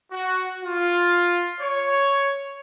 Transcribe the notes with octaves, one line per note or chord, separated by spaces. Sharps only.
F#4
F4
C#5